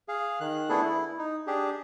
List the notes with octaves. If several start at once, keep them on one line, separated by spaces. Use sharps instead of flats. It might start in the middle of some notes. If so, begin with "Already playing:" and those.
G#4 F5
D#3 F#6
A3 B3 D4 E4 G#4 A4
E4
D#4
D4 G4 G#4